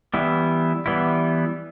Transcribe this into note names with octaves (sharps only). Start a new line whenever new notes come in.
E3 G3 B3 E4
E3 G3 B3 E4